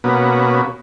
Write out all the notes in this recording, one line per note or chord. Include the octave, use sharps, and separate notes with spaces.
B2 A#3 B3 C#4 F#4